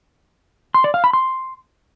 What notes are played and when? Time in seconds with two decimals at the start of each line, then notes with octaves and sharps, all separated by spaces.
0.74 C6
0.84 D5
0.94 F5
1.04 B5
1.13 C6